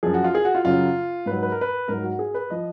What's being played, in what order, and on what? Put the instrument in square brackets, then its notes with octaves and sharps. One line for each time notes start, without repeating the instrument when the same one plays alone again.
[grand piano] F#2 F3 G#4
F#4
F4
G#4
F#4
F4
F#2 C#3 F#3 F4
G#2 F#3 B4
B4
A#4
B4
G#2 F#3 A#4
F#4
G#4
B4
F3 D#5